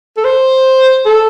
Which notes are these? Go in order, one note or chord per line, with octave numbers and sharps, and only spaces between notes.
A4
C5
A4